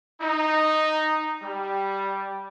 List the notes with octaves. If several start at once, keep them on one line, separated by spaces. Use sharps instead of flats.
D#4
G3